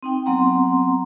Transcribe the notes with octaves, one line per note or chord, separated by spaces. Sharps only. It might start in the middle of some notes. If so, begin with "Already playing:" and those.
C4 D#4 G5
F#3 B3 C4 F#5 A#5 C6